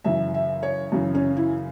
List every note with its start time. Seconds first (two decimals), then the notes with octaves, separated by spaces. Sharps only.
0.04 F#2 C#3 E3 E5
0.34 E5
0.63 C#5
0.92 F#2 C#3 E3
1.15 C#4
1.37 E4